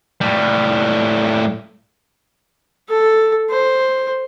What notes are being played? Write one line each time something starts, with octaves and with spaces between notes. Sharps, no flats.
A2 G3
A4
C5